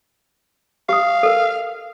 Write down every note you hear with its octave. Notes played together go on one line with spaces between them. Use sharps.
G4 F5 D#6
A4 A#4